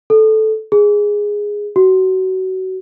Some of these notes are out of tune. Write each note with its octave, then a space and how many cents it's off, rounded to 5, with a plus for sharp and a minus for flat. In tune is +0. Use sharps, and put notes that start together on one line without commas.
A4 -10
G#4 -5
F#4 +25